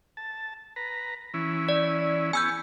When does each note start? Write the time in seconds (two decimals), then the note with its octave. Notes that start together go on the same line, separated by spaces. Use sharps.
0.17 A5
0.76 B4 A#5
1.34 E3 C#4 E4
1.69 D5
2.33 B3 G#4 G#5 C#6 E6 G6